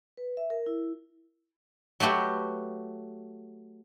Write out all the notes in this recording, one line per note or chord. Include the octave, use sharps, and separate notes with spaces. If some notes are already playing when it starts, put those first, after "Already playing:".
B4
E5
A#4
E4
F#3 A3 F#4 G4 B4